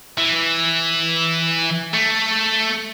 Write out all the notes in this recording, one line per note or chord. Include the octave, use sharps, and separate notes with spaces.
E3
A3